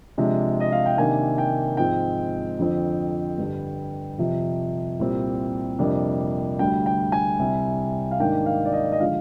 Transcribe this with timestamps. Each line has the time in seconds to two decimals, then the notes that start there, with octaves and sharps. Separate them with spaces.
0.18 C3 F3 G#3 D4
0.60 D#5
0.72 F5
0.86 G5
0.97 C3 D#3 A#3 D4 G#5
1.38 G5
1.77 G#2 F3 G#3 C4 G5
2.59 F2 D3 F3 C4
3.38 G2 D3 G3
4.18 F2 C3 F3
4.99 C2 A#2 G3 C4
5.79 F2 C3 G3 A#3 D4
6.59 D2 D3 G3 G5
6.86 G5
7.12 G#5
7.39 C2 C3 G3
8.11 F5
8.20 G#2 D#3 A#3 D4 G5
8.46 F5
8.65 D5
8.73 D#5
8.92 D#5
9.00 D3 F3 G#3 F5